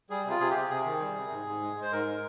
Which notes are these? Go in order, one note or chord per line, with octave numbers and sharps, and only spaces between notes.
G3 G#4
C3
F4
C3 G#4
G4
C3
C3 G#4
D#3
G3
C3
G#2
G#2
G#3
G#3
C5
G#2 A#4
G#3